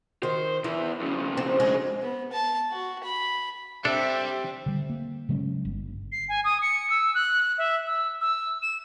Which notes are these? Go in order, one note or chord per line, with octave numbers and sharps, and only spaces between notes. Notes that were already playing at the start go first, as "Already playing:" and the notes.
D#3 C5
E2 E3 E4
F2 C#3
C4
G#3
B3
A5
F#4
B5
G3 C4 D4 A4 E5
D3 G3
A#3
C#3 F#3 G#3 C#4
G1
C7
G#5
D#6
C#7
E6
F#6
E5
E6
E6
E7